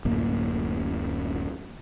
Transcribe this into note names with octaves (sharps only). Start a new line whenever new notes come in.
D1 F#2 A2 A#3